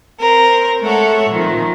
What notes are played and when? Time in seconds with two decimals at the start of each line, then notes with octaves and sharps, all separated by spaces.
0.18 C4 A#4 C5
0.81 G#3 A3 A4 C#5 E5 F#5
1.27 A#2 D#3 F3 C4